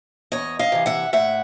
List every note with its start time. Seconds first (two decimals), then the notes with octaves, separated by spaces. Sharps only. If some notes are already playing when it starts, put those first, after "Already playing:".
0.32 E2 C#5 D#5
0.59 D#5 F5
0.72 C3 E3
0.86 E5 F#5
1.13 A2 E5 F#5